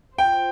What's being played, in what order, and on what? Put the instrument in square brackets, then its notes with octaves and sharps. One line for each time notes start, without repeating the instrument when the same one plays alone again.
[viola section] F4 C5 [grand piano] G5